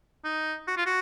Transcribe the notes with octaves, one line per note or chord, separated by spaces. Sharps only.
D#4
F#4
F4
F#4